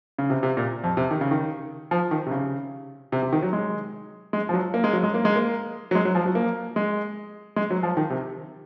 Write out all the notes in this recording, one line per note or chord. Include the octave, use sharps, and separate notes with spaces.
C#3
C3
C3
A#2
F2
C3
D#3
C#3
D#3
F3
D#3
C3
C#3
C3
C3
D#3
F#3
G#3
G#3
F3
F#3
A#3
G#3
F#3
G#3
A#3
G#3
A#3
F#3
G#3
F#3
F3
F#3
A#3
G#3
G#3
F#3
F3
D#3
C3